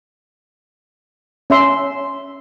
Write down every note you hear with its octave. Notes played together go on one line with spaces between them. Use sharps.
C#4 E5 C6